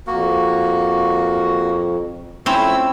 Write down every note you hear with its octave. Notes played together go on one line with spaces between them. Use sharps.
F2 A#3 F#4
F2 C4 C#4 E4 E6